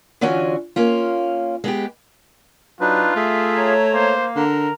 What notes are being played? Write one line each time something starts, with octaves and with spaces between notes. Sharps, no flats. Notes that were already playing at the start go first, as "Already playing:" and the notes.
D3 E3 C#4 F4 F#4 G#5
A#3 C#4 F4
G#3 B3 G4
F#3 D4 D#4 F4 B4
A3 G#4 E5
C#5 A#5
A#3 C5
D3 A#4 A#5